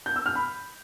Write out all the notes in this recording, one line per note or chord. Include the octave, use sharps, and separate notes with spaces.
G6
E6
F6
B5